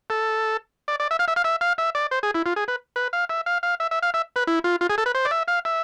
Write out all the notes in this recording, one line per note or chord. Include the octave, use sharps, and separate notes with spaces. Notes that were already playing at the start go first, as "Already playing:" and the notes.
A4
D5
D5
E5
F5
E5
F5
E5
F5
E5
D5
C5
G#4
E4
F4
G#4
B4
B4
F5
E5
F5
F5
E5
E5
F5
E5
B4
E4
F4
F4
G#4
A4
B4
C5
D5
E5
F5
E5